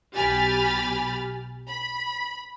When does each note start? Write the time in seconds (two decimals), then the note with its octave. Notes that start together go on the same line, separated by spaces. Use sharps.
0.16 B1 G4 G#5 B5 F6 A6
1.68 B5